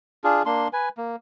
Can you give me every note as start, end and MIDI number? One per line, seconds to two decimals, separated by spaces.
0.24 0.43 62
0.24 0.43 65
0.24 0.43 68
0.46 0.68 58
0.46 0.68 62
0.46 0.68 84
0.73 0.89 71
0.73 0.89 80
0.97 1.16 58